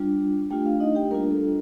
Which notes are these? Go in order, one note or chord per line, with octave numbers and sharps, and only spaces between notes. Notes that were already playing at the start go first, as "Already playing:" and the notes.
Already playing: G3 D4 F4
A3 D4 F4 G4 G5
F4 F5
D#4 D#5
G4 G5
G3 A#3 D4 F4 A#4
A4